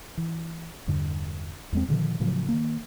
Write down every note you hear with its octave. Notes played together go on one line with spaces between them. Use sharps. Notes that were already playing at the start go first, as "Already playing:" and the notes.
E3
E2 G2 D3
E2 G#3 C4
A#2 D3 D#3 F3
A2 C#3 F3 F#3
D#3 A#3